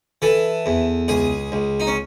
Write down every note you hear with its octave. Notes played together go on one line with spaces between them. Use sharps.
E3 A4
E2
C#2 G#4
C#2
D#4
C#4